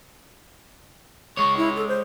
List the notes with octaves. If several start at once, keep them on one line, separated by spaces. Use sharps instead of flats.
G#3 C#5 C#6
E4
A4
C5